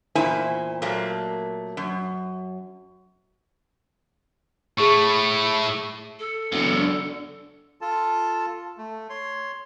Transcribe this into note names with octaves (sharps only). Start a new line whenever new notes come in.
E2 A#2 E4 C5 G#5
A#2 F#3 A3 A#3
F#2
A2 A3 G#4 C#6
A4
E1 F#2 C#3
D3
F4 A4 A5
A3
C#5 C6